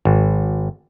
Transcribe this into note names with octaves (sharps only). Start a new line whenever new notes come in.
G#1